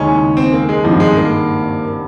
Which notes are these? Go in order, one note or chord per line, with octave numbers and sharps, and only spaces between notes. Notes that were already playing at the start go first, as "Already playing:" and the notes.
Already playing: D#2 C#3 G#3 C#4 D#4
C4
A#3
G#3
G#1 G2 D#3 F3
G#3
A#3